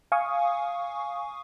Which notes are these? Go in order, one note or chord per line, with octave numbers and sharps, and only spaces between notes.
F5 G#5 C#6 D#6